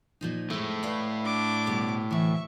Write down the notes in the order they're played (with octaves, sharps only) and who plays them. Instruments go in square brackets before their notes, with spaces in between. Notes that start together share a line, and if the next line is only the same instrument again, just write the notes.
[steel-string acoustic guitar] A#2 F3 D#4
[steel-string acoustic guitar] F2 G#3 [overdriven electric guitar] A2 A3
[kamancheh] B4 [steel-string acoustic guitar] D5 F5
[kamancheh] D4 D6
[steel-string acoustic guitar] D2 B2 G3
[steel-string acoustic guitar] D2 E3 [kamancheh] E5 C#6